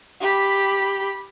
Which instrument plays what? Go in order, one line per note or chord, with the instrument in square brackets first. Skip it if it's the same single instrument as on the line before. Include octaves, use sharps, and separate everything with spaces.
[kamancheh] G4 B5